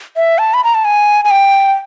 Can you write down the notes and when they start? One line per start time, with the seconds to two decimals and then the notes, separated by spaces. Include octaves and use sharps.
0.16 E5
0.38 A5
0.54 B5
0.64 A#5
0.75 A5
0.85 G#5
1.25 G#5
1.31 G5